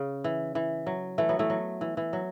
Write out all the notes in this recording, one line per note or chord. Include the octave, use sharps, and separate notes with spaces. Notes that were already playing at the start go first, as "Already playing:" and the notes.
Already playing: C#3
E3
E3
F#3
E3 A3
F#3 B3
E3 A3
F#3
E3
E3
F#3